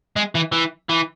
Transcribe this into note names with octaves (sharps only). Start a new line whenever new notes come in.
G#3
E3
E3
E3